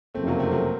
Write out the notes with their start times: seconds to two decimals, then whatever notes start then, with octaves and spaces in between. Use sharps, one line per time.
0.14 F#1 F2 C3 A3 C4
0.27 F#3 A#3
0.39 A3 C4
0.51 F#3 A#3